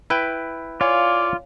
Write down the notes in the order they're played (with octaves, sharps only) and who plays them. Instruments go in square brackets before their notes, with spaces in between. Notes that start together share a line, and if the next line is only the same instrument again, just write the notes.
[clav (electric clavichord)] E4 B4 G5
[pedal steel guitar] F4 [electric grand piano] C#5 F5 G#5 [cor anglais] D5